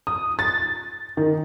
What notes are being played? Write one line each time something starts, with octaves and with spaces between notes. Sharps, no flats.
D#6
A6
D#3